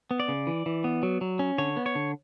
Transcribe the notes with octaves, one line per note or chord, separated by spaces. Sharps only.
B3
D5
C#3
E3
E3
B3
F#3
F#3
C#4
D3 C#5
B3
C#5
D3